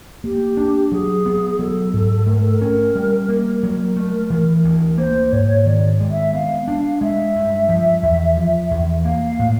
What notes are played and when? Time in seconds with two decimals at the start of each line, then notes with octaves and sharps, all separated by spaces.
0.24 A#3 G4
0.57 D4
0.92 F#3 G#4
1.26 B3
1.59 F#3 A4
1.93 G#2
2.27 A3 A#4
2.41 A4
2.54 A#4
2.61 C#4
2.95 G3
3.29 A#3
3.63 F#3 A#4
3.96 A3
4.30 E3
4.64 D2
4.98 A#3 C5
5.32 G#2 C#5
5.66 D#3 D5
6.00 G#3
6.11 E5
6.33 B3 F5
6.68 D4
7.01 G#3 E5
7.36 G2
7.69 F3
8.03 E2
8.37 F3
8.71 E2
9.04 A#3 F5
9.39 A2